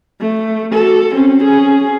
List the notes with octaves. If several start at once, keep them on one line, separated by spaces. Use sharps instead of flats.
A3
F#4 A4
C4 C#4
C#4 G#4